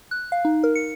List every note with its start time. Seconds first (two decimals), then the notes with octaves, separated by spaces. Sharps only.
0.11 F#6
0.32 F5
0.45 D#4
0.64 A#4
0.75 C#7